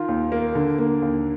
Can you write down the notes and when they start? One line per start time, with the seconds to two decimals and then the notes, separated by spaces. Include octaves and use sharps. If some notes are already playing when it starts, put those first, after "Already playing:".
Already playing: D#3 F4
0.08 D#2
0.32 A#3
0.55 D3
0.79 A#3
1.02 D#2